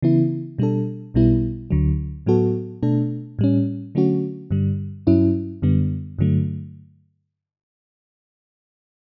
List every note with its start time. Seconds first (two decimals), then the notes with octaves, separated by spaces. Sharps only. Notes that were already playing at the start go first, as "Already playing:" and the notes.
0.02 C#3 E3 B3 E4
0.58 B2 G3 D4 A4
1.14 B1 B2 G3 B3 E4
1.71 D2 D3 F#3
2.26 A2 F#3 B3 F#4 A4
2.83 B2 A3 D4 A4
3.39 A2 G3 C#4
3.95 D3 F#3 A3 C#4 F#4
4.51 G2 D3 G3
5.07 G2 F#3 C#4 E4
5.62 F#2 D3 G3 B3
6.19 G2 D3 F#3 A3